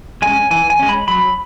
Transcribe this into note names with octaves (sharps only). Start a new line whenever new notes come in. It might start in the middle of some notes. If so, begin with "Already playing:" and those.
G#3 C#4 G#5
E3 G#5
G#5
G#3 C#4
B5
F#3 B5